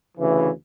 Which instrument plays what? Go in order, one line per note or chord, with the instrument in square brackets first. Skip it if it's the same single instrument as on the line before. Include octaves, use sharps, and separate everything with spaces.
[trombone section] D2 C#3 E3